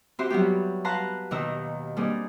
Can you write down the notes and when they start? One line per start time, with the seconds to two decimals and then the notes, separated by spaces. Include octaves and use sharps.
0.19 C4 F#4 G4 E5 C6
0.30 F#3 G3 B3 G4
0.85 B4 F5 F#5 A5 A#5 C6
1.31 D#2 B2 D#3 D#4 A#5 E6
1.96 G3 A#3 C4 D4 D#4 G#4